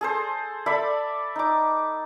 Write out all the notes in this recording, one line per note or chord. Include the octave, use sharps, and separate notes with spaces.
G#4 A4 C5
A4 D5 E5 B5
D#4 D6